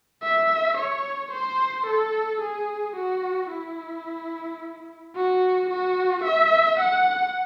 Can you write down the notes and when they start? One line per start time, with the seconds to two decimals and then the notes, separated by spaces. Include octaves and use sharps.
0.23 E5
0.78 C#5
1.32 C5
1.87 A4
2.42 G#4
2.96 F#4
3.52 E4
5.16 F#4
5.70 F#4
6.25 E5
6.80 F#5